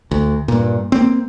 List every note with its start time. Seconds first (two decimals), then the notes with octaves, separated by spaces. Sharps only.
0.11 D2
0.48 G2 A#2
0.92 A#3 C4